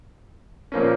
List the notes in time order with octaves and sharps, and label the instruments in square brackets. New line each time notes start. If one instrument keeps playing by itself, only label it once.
[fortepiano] A#2 F3 A#3 C#4